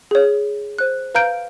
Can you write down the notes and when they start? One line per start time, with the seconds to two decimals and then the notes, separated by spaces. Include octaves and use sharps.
0.11 G#4 C#5
0.79 C5 F#6
1.15 B4 F5 A#5 F6 G6 D7